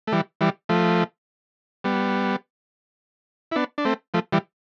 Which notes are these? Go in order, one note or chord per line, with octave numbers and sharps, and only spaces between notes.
A3
E3 G3
E3 G3
F3 A3
G3 B3
E4
B3 D4
D4
A3 C4
F3 A3
E3 G3